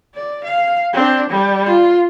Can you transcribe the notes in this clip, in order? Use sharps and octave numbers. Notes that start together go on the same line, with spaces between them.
D5
F5
C4 D4
G3
F4